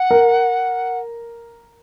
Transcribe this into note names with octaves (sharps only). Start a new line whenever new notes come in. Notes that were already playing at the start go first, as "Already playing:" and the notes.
Already playing: F#5
A#4